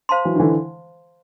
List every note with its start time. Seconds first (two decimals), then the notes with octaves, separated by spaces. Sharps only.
0.09 C5 F5 A5 C6
0.25 E3 F#3
0.35 D#3
0.40 D3 E3